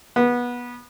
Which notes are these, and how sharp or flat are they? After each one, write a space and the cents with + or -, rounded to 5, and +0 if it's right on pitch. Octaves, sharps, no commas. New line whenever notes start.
B3 -20